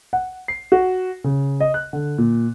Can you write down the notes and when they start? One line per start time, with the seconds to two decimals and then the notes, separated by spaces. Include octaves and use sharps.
0.13 F#5
0.48 C7
0.72 F#4
1.24 C#3
1.60 D#5
1.74 F#6
1.93 D3
2.18 A#2